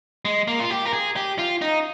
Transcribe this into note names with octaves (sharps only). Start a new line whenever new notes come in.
G#3
A#3
F4
G4
A#4
G#4
G4
F4
D#4